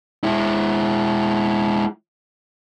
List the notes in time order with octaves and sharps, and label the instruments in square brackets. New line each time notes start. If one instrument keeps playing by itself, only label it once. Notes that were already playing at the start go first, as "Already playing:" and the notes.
[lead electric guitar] G#3 E4